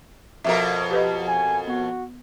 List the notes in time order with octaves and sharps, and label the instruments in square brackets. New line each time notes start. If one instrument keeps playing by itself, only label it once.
[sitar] F2 B2 A#4 [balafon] E5
[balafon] G4 B4 D#5
[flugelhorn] G#5
[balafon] B3 [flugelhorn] F#4